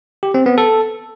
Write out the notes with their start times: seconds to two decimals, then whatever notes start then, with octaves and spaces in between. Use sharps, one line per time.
0.23 G4
0.34 C4
0.46 B3
0.58 A4